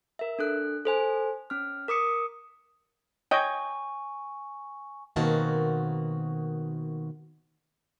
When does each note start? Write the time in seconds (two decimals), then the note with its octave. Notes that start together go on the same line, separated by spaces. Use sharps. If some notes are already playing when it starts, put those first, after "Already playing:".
0.19 A#4 E5
0.39 D4 A4 F#6
0.85 A4 C5 G#5
1.50 C#4 F6
1.88 A#4 D6 D#6 C#7
3.31 C#5 D#5 G5 G#5 C#6
5.16 B2 D#3 A#3 C4 F#4 A5